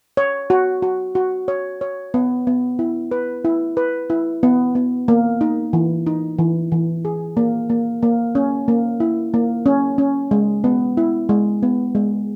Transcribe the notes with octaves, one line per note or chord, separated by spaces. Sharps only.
C#5
F#4
F#4
F#4
C#5
C#5
B3
B3
E4
B4
E4
B4
E4
B3
B3
A#3
D#4
E3
D#4
E3
E3
G#4
A#3
A#3
A#3
C#4
A#3
E4
A#3
C#4
C#4
G#3
B3
E4
G#3
B3
G#3